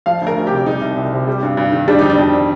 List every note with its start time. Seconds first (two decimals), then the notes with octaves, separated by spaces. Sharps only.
0.06 F3 F5
0.22 D2
0.27 A#4
0.36 D2
0.47 G4
0.52 C3
0.66 G3 D#4
0.81 C2
0.97 C2
1.13 C3
1.27 G3
1.43 G2
1.57 G2
1.72 D#3
1.88 G3 D4
1.99 F2 D#4
2.10 D4
2.18 F2
2.32 D#3